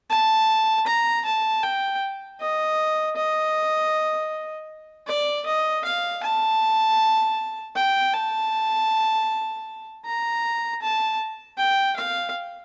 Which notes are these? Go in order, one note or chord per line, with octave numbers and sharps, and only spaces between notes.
A5
A#5
A5
G5
D#5
D#5
D5
D#5
F5
A5
G5
A5
A#5
A5
G5
F5